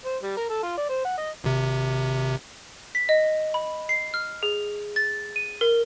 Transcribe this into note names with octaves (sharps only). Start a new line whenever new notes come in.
C5
G3
A#4
A4
F4
D5
C5
F#5
D#5
G#1 C3
B6
D#5
B5
C7
F6
G#4
A6
D#7
A#4